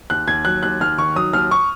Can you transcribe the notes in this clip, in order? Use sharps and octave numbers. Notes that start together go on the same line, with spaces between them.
D#2 F#6
D#2 G#6
F#3 F#6
D#2 F#6
D#2 F6
D#3 C#6
F#3 D#6
D#2 F6
C#6